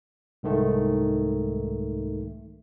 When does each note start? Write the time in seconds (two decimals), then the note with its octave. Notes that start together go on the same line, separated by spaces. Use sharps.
0.43 C2 G#2 D#3 A3